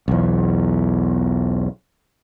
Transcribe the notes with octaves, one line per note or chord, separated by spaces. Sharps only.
B1 E2